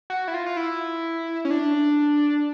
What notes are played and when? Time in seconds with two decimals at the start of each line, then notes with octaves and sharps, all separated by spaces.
0.10 F#4
0.28 E4
0.34 F4
0.46 F4
0.57 E4
1.45 C#4
1.51 D4